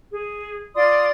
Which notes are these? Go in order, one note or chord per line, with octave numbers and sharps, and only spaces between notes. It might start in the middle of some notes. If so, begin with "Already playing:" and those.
G#4
F4 D5 C6 D#6